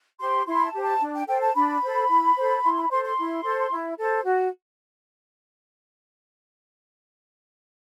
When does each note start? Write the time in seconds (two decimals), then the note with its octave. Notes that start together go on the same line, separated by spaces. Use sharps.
0.19 G4 C5 C6
0.46 E4 C6
0.56 B5
0.65 A5
0.74 G4 C5
0.83 A5
1.00 D4
1.15 G5
1.27 A4 C5 G5
1.41 A5
1.55 D4 B5
1.82 A4 C5
2.10 E4
2.36 A4 C5
2.63 E4 C6
2.77 B5
2.91 A4 C5 C6
3.03 C6
3.18 E4
3.44 A4 C5
3.72 E4
3.98 A4 C5
4.25 F#4